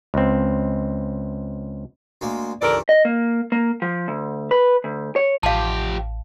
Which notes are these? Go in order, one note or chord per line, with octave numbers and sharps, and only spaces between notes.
C#2 C4
D2 G#3 A#3
C#2 G2 E3 A4 A#4 D5
D#5
A#3
A#3
F3
D2
B4
D2
C#5
A1 F3 G4 F5 A5